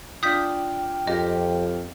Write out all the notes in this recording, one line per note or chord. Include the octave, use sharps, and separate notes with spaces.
D4 F4 G5 D#6 G6 B6
F2 F4 G4 D#5